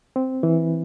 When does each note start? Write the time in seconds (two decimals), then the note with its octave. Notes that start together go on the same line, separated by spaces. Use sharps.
0.16 C4
0.43 E3